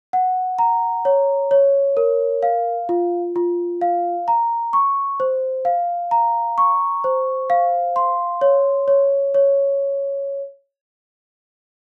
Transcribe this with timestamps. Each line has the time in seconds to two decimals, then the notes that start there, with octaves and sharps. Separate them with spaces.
0.13 F#5
0.59 A#5
1.05 C#5
1.51 C#5
1.97 A#4
2.43 F5
2.89 F4
3.36 F4
3.81 F5
4.28 A#5
4.73 C#6
5.20 C5
5.65 F5
6.11 A#5
6.58 C#6
7.04 C5
7.50 F5
7.96 C6
8.41 C#5
8.88 C#5
9.34 C#5